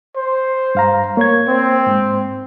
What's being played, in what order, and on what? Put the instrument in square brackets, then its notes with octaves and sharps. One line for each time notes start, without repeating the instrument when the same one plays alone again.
[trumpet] C5
[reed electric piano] G2 F5 A#5
[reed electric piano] A#3 G#6 [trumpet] C#5
[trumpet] C4
[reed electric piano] G#2